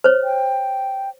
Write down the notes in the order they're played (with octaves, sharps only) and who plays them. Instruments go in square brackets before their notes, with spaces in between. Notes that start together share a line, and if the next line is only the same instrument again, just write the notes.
[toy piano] C5 C#5
[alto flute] G5